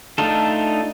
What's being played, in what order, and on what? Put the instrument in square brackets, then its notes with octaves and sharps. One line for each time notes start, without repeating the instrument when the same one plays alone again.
[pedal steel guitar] A3 D4 D#4 F4 A4